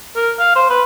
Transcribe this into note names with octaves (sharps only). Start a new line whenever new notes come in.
A#4
F5
C5
B4